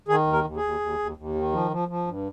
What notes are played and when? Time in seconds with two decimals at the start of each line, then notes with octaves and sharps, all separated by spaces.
0.08 D#3 G#4
0.27 D#2
0.33 A#4
0.44 D#2
0.57 G#4
0.63 D#2
0.80 D#2
0.99 D#2
1.17 D#2
1.35 D#3
1.52 F3
1.71 F3
1.88 F3
2.07 G2